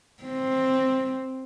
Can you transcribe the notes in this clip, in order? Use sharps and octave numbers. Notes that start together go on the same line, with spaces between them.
C4